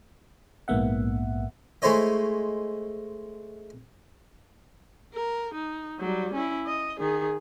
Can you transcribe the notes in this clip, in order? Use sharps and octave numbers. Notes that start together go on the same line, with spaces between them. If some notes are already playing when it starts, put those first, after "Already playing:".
A#1 G#2 A#3 B3 E5 F#5
G#3 A3 E4 C5 C#5 D#5
A#4
D#4
F#3 G3
C#4 E4
D#5
D#3 G#4